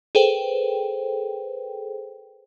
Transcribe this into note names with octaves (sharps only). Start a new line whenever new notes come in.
G#4 A4 B4 C5 G5